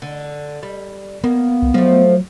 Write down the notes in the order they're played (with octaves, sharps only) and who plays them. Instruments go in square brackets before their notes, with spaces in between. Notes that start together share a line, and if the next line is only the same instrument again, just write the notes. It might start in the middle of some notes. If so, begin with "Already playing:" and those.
[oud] D3
G3
[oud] A#3 [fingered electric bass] B3
[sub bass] C2
[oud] F3 A3 [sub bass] F#3